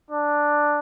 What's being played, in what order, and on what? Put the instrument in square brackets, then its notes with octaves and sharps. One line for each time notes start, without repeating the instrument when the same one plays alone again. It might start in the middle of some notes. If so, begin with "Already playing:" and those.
[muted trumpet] D4